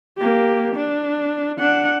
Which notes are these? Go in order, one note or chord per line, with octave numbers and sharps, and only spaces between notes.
A#3 G4
D4
D4 F#5